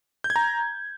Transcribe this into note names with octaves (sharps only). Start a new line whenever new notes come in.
G6
G#6
A#5